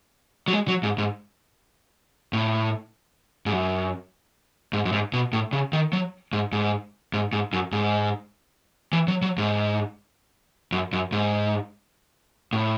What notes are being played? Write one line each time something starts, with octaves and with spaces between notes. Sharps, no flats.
F#3
G#3
F#3
G#2
G#2
A2
G#2
F#2
G#2
F#2
G#2
B2
A2
C#3
D#3
F#3
G#2
G#2
G#2
G#2
F#2
G#2
E3
F#3
F#3
G#2
F#2
F#2
G#2
A2